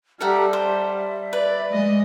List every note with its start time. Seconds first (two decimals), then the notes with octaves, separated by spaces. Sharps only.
0.21 G3 G4 A4 E5 F#5 A#5 F6
0.53 C5 E5
0.96 E5
1.33 B4 D5
1.72 G#3 D#5